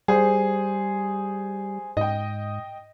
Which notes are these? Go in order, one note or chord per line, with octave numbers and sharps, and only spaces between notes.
G3 G#4 C5
G#2 D#5 G5